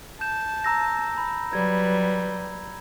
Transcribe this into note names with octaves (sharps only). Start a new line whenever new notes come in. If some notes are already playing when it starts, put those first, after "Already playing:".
A5 G6 E7
A#5 E6 A#6
B5
F#3 G3 B4 G#6